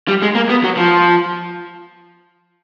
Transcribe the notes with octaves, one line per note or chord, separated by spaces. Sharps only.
G3
G#3
A#3
B3
F#3
F3